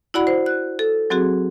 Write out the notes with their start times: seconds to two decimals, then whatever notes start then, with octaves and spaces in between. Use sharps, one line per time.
0.14 E4 F#4 D5 F#5 B5
0.27 C5
0.46 F#6
0.79 A4
1.10 F#3 C4 F#4 G#4